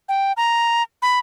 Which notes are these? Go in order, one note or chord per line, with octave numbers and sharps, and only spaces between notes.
G5
A#5
B5